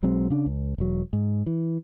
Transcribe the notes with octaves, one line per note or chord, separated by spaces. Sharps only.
B1 F#3 G#3 C4
C#3 D4
C#2
E1 F#3
G#2
E3